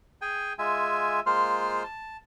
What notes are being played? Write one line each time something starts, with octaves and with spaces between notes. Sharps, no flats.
G#4 G5 G#5
G#3 F4 E5 G#5
G#3 A#3 F4 C5 C6 F6
A5